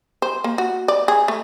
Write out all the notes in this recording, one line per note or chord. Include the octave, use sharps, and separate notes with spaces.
C5
A#3
F#4
D5
G#4
A3